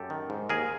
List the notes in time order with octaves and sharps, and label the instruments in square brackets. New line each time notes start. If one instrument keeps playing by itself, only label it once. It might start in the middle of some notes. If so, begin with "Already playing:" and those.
Already playing: [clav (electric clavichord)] F#2 G4 A4
D#3
G#2
D#2 G#4 A#4